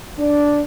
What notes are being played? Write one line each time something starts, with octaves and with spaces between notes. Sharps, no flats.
D4